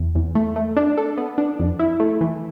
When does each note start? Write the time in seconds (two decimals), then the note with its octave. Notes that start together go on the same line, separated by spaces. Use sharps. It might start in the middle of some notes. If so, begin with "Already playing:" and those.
Already playing: E2
0.15 E2
0.35 A3
0.56 A3
0.77 D4
0.97 A4
1.17 B3
1.38 D4
1.59 F2
1.79 E4
2.00 A3
2.21 E3